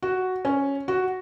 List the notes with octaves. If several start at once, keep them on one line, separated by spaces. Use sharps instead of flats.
F#4
C#4
F#4